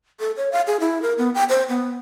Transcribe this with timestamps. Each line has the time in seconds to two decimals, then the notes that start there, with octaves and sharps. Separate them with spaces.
0.20 A4
0.37 C#5
0.52 F5
0.67 G#4
0.80 E4
1.02 A#4
1.18 B3
1.35 G5
1.49 C5
1.69 B3